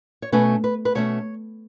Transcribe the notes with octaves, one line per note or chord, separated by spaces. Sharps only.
C#5
B2 A3 C#4 B4
B4
B4
B2 A3 C#4 C#5